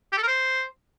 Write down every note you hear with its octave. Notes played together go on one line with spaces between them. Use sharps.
G4
A4
A#4
C5